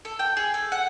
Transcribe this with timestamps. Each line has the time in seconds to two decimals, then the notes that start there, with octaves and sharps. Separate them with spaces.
0.05 A4
0.19 G5
0.37 G#4
0.54 A4
0.72 F#5